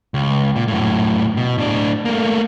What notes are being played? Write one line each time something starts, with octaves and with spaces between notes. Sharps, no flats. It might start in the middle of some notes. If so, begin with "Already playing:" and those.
C#2
A#2
F#2 A2
B2
A2 D4
A3 A#3